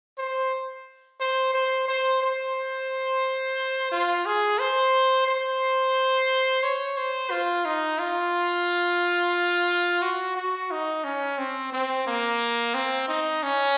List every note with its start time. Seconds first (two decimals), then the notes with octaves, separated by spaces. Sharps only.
0.18 C5
1.20 C5
1.54 C5
1.88 C5
2.22 C5
3.91 F4
4.26 G#4
4.59 C5
5.27 C5
6.63 C#5
6.97 C5
7.30 F4
7.65 D#4
7.99 F4
10.02 F#4
10.36 F#4
10.71 D#4
11.04 C#4
11.38 C4
11.72 C4
12.07 A#3
12.74 C4
13.08 D#4
13.43 C#4